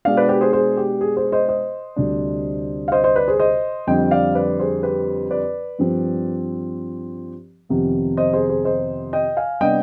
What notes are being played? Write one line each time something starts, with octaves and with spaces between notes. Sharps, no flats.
B2 G#3 B3 D4 D5 F5
B4 D5
G4 B4
G#4 C5
G#4 C5
G4
G#4
G#4 C5
C5 D#5
C5 D#5
D2 C3 G3 D4
F5
C5 D#5
C5 D#5
B4 D5
G#4 C5
C5 D#5
F2 D3 G3 C4 D#5 G5
D5 F5
B4 D5
G#4 C5
G4 B4
B4 D5
G2 F3 C4
F2 C3 D#3 B3
C5 D#5
G#4 C5
G#4 C5
C5 D#5
D#5 G5
F5 G#5
C3 G3 B3 D4 D#5 G5